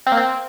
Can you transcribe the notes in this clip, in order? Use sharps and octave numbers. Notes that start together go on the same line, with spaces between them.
C4
A#3
C4